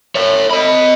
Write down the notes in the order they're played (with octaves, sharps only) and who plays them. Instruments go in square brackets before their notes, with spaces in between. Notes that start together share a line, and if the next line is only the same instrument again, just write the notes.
[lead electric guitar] C#5 E5
D#5 B5